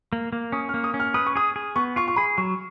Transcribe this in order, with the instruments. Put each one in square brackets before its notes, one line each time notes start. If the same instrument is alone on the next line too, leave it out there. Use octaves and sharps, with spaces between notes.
[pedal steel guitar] A#3
A#3
[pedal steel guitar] C#4 [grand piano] D#6
[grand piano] F6
[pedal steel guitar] A#3
[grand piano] D#6
[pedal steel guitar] C#4
[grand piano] F6
[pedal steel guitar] B4 [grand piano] D#6
[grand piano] C#6
[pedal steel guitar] G#4 [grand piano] D#6
[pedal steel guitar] G#4
[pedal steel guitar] B3 [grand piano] C#6
[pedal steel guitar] F4 [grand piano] C#6
[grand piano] C#6
[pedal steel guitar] G#4 [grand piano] B5
[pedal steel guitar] F#3 [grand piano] C#6